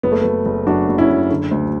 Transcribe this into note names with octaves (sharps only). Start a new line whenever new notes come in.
F#1 B3
A3
F#1 B3
F#1
F#2 D4 F#4
F#1
C#4 E4
F#1
D3
D2